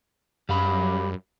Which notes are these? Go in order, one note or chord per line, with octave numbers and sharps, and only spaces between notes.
F#2 G3 F5 B5